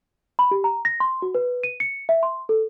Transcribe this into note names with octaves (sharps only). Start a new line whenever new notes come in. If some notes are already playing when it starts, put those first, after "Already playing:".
B5
G4
A#5
A#6
C6
F#4
B4
D#7
C#7
E5
C6
A4